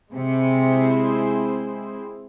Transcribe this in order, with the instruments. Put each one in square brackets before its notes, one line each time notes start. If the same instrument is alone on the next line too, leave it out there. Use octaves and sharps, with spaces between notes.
[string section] C3 [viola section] G#3 C4 E4 G#4 C5